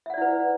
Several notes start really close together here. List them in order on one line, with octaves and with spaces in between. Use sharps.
E5 F#5 D5 E4 B4